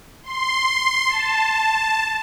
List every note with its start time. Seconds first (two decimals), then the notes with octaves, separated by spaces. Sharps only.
0.23 C6
1.08 A5